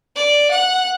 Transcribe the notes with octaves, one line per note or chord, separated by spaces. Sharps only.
D5
F#5